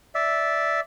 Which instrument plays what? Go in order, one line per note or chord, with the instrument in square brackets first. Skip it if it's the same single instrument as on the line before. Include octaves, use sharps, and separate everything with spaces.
[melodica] D5 E5